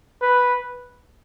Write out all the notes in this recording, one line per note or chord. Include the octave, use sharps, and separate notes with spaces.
B4